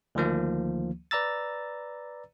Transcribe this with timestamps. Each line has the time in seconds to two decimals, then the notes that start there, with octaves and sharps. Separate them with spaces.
0.15 D2 D#3 F3 A#3
1.11 B4 D5 A#5 E6 A6